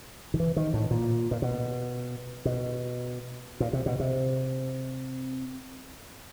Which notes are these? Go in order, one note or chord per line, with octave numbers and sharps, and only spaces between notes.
D#3
E3
D#3
A2
A#2
A#2
B2
B2
A#2
C3
B2
C3